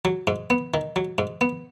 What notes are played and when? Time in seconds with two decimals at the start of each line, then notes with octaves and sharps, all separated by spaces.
0.05 F#3
0.27 G#2
0.50 B3
0.74 D#3
0.96 F#3
1.18 G#2
1.41 B3